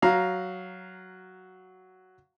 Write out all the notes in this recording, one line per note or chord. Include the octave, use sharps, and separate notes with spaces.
F#3 F5 A#5